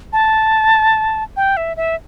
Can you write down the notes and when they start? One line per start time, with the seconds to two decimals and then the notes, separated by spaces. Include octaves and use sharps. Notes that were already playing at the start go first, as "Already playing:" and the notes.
0.13 A5
1.37 G5
1.57 E5
1.77 E5